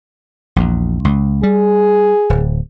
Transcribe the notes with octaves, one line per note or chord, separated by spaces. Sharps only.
A#1 E2
C#2
G3 G#4
D1